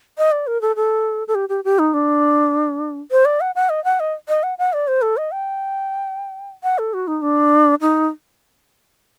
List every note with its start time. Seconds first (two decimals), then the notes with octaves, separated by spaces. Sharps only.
0.18 D#5
0.32 D5
0.47 A#4
0.62 A4
0.76 A4
1.28 A4
1.35 G4
1.49 G4
1.64 G4
1.79 D#4
1.94 D4
3.11 C5
3.25 D5
3.41 F#5
3.55 F#5
3.70 D#5
3.84 F#5
4.00 D#5
4.29 D#5
4.43 F#5
4.58 F#5
4.73 D5
4.88 C5
5.02 A4
5.17 D#5
5.32 G5
6.63 F#5
6.78 A4
6.94 F#4
7.08 D#4
7.22 D4
7.81 D#4